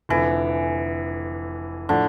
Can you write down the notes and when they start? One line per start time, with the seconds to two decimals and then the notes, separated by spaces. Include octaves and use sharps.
0.09 F1 F2 D3 E3
1.89 A2 D3 F3